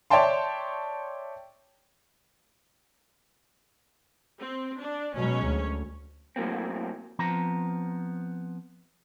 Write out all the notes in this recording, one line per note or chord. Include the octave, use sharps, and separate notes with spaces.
C#5 D5 E5 G5 A5 C6
C4
D4
B2 F#3 G#3 C#4 C#5
D2
F#2 A2 F#3 A#3 C4
F3 B3 C4 A#5